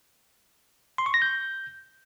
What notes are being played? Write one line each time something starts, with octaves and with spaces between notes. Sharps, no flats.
C6
C#6
A#6
G6